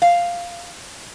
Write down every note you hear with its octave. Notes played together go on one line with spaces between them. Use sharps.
F5